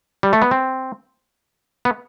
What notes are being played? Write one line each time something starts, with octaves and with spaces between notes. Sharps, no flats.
G3
A3
B3
C4
B3